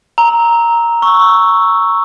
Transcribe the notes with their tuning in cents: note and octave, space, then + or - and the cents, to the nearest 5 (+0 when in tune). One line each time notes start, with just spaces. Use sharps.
A#5 +0 E6 -20
C#6 +0 E6 +0